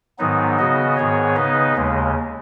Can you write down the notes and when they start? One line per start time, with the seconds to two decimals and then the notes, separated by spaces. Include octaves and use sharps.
0.19 G#2 D#3 F#3 B3 D#4
0.58 C#3 B3 F#4 D#5
0.97 G#2 D#3 B3 G#4 C#5
1.36 C#3 B3 D#4 B4 D#5
1.76 D#2 C#3 G#3